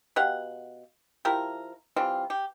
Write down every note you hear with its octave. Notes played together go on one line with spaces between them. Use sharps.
B2 G4 F5 F#5
F3 E4 G4 A#4
E3 G3 C4 F4
G4